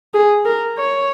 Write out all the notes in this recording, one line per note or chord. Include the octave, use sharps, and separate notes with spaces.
G#4
A#4
C#5